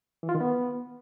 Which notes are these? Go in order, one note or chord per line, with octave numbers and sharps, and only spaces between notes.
E3
F4
D#3
B3